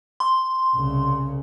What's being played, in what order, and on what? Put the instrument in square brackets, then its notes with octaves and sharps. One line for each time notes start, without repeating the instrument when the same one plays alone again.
[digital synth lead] C6
[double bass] C2 C#3